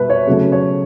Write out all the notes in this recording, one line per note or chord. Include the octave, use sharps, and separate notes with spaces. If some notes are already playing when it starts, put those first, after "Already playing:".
Already playing: B2 G3 B4 E5
C#5
C#3 F#3 A3
C#5